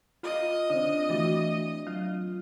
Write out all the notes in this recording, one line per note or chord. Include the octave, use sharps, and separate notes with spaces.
F4 D#5
D3 C4 D4
E3 A3 F#4 D6
F#3 F4